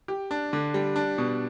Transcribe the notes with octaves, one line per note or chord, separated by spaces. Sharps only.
G4
D4
D3
G3
D4
B2